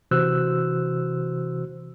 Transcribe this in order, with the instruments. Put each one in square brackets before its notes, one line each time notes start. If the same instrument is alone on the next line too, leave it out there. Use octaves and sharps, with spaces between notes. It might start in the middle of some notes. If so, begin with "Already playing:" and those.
[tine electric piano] C3 E3 F#4 C5 E6 F#6